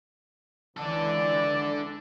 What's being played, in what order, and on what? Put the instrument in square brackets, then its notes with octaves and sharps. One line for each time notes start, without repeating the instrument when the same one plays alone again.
[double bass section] C#2 E3 [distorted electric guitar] D4 A4 [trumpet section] D5